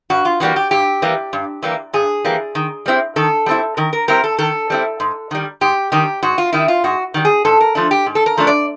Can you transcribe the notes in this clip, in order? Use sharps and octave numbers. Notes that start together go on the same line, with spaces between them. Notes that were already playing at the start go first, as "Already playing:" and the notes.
G2 F#4
F4
E3 G3 A#3 F#4
G4
G2 G4
E3 G3 A#3
G2
E3 G3 A#3
G2 G#4
E3 G3 A#3
D#3
G3 C4 E4
D#3 A4
G3 C4 E4
D#3 A#4
A#4
G3 C4 E4 A#4
A4
D#3 A4
G3 C4 E4
G#2
D#3 G3
G#2 G4
D#3 G3 G4
G#2 F#4
F4
D#3 G3 E4
F4
G#2 F#4
D#3 G3
G#4
G#2 A4
A#4
F3 A3 D4 A4
G4
G#2
A4
A#4
F3 A3 D4
D5